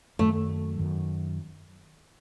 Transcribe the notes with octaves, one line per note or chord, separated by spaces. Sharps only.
F#2 D#3 F#3 A3
F#2 D#3 F#3